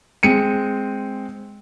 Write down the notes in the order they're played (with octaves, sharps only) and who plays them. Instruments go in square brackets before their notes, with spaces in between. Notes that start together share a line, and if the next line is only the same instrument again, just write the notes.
[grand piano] G#3 C4 C#7 D#7